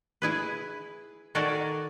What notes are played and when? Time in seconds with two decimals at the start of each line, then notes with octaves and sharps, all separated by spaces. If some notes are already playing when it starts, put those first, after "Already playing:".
0.22 E4 G#4 B4
1.35 D#3 F#4 A4 A#4 D5 G#5